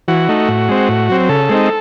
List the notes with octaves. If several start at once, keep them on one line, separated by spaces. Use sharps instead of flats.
E3 F#4
A3 D#4
A2
G#3 C4
A2
F#3 C4
C#3 A4
G#3 C4 D#4